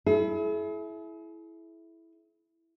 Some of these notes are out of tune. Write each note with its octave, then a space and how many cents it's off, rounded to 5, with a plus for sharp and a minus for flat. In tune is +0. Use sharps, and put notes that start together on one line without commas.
E4 +0 G#4 +45